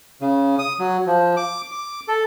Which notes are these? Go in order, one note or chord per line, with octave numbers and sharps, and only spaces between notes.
C#3
D#6
F#3
F3
D6
D6
A4